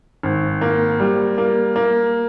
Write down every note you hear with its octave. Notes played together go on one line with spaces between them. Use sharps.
G#1
A#3
G3
A#3
A#3